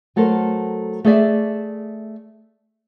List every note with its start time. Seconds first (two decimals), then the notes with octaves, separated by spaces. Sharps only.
0.16 F#3 A3 A4 A#4 C5
1.04 A3 G#4 D5 E5